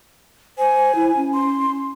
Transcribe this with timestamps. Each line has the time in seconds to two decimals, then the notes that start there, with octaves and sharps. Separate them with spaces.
0.58 C5 G#5
0.95 E4
1.17 C#4
1.33 C6